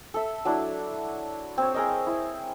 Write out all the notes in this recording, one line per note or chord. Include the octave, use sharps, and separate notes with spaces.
A4 E5
F#3 D4 E4
C4 C#5
G#4 A#4 D#5
E4